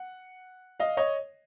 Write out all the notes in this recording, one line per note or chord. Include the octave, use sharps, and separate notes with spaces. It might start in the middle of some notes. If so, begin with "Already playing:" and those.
Already playing: F#5
D#5 F5
C#5 D#5